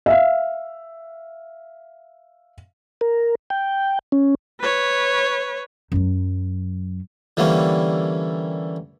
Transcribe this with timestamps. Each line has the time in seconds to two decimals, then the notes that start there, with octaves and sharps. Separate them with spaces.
0.06 E5 F5
3.01 A#4
3.50 G5
4.12 C#4
4.60 B4 C#5
5.92 F#2 F#3
7.37 D3 E3 G3 A#3 C#4